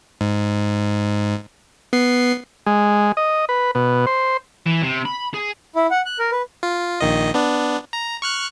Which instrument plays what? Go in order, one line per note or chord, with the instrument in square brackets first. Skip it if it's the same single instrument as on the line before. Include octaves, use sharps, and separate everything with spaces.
[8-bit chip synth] G#2
B3 C7
[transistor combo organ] G#3
D#5
B4
B2
C5
[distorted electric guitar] E3
C3
B5
G#4
[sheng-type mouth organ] E4
F#5
F#6
A#4
B4
[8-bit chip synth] F4
A#1 D#3 D#5
B3 D4
A#5
C#6 F6 F#6